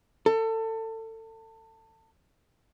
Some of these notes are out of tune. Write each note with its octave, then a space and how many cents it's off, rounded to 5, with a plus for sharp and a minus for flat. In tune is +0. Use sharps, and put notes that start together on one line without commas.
A4 +25